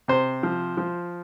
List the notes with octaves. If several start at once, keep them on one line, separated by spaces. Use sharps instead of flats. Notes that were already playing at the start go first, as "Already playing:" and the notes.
C3 C5
F3
F3